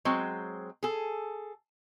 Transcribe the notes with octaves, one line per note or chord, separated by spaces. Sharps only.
F#3 G#3 C4
G#4 A4